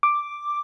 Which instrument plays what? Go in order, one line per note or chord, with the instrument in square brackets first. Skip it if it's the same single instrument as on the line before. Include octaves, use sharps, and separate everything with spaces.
[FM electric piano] D6